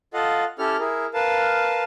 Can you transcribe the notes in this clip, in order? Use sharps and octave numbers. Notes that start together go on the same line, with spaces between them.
F4 A4 D#5 F5 F#5
C#4 E4 G4 A4 C#5 F6
E4 G#4 A#4
A#4 B4 F5 A5